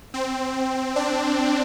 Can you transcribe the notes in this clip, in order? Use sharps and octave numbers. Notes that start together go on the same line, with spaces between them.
C4
D4